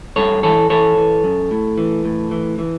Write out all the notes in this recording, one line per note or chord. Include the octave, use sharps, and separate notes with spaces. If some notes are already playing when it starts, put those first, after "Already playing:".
G2 A4 C#5
E3 A4 C#5
E3 A4 C#5
E3
F#2
A2
E3
A2
E3
E3